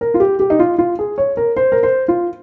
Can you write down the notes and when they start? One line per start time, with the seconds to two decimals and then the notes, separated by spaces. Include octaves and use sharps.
0.01 A#4
0.14 F4
0.20 G4
0.40 G4
0.50 D#4
0.59 F4
0.78 F4
0.99 G#4
1.18 C#5
1.37 A#4
1.56 C5
1.72 A#4
1.83 C5
2.08 F4